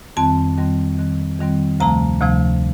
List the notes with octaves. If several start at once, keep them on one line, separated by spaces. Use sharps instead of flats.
F2 D#3 G3 C4 A5
F2 D#3 G3 C4
F2 D#3 G3 C4
F2 D#3 G3 C4
D2 C3 F3 A3 A#5
D2 C3 F3 A3